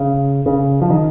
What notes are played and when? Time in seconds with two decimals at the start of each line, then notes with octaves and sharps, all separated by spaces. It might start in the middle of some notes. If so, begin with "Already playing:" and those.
Already playing: C#3
0.46 C#3
0.82 F3
0.90 D#3